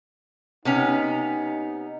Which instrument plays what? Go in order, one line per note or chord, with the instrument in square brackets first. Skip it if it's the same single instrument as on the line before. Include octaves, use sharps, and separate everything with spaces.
[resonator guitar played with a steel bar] C3 B3 C#4 [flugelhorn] D#4